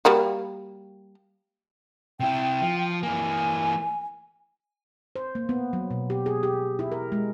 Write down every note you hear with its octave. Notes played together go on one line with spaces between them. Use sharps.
G3 A#3 F#4
C3 E4 G5
F3
E3 A#3 G#5
C5
A#3
B3
F#3
B2
G4
G#4
G4
E4
A#4
G#3